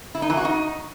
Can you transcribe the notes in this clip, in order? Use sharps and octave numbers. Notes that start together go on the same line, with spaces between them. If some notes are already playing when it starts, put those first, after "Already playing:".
E4
D#4
E3
F#4
D#4